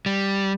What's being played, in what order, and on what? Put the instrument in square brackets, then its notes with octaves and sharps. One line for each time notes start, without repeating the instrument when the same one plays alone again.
[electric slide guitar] G3